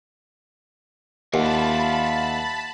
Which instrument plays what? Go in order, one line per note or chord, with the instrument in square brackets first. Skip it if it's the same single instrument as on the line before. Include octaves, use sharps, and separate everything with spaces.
[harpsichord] D#2 [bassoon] F4 [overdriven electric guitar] E5 F#5 [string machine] A5 B5